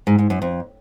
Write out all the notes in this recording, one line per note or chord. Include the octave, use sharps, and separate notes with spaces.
G#2
G#2
F#2
F2